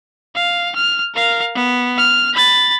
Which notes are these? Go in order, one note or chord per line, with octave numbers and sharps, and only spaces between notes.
F5
F6
A#4 F5
B3
F6
B5 A6